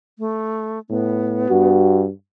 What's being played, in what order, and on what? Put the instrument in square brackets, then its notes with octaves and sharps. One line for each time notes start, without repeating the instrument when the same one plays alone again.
[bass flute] A3
[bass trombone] A2 [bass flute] B3
[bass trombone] G2 [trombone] F#4